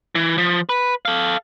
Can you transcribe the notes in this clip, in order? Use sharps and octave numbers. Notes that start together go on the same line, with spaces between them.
E3
F3
B4
A4 F5